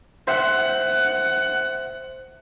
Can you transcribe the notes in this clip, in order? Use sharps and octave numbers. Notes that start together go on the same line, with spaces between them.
C5 E5 F#5